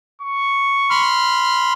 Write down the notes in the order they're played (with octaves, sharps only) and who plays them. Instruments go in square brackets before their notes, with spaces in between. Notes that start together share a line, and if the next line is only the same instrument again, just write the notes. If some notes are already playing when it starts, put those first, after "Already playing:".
[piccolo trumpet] C#6
[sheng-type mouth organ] B5 C6 F6